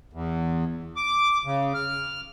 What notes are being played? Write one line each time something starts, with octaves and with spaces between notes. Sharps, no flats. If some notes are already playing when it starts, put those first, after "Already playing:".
E2
D6
C#3
F6